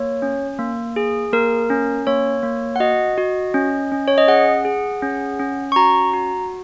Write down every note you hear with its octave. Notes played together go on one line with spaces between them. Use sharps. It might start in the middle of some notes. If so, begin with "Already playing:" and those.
Already playing: A#3 C#5
C#4
A#3
G#4
A#3 A#4
C#4
A#3 C#5
A#3
F#5
F#4 D#5
F#4
C#4
C#4
C#5
D#5
G#4 F#5
G#4
C#4
C#4
C#6
F#4 A#5
F#4